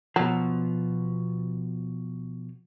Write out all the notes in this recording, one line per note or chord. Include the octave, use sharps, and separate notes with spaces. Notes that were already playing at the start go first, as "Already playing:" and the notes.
B2 F3 F#3